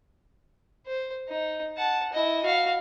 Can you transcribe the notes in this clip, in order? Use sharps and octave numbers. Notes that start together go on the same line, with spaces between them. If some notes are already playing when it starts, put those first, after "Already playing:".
C5
D#4
F#5 A5
E4 D#5
F#4 F5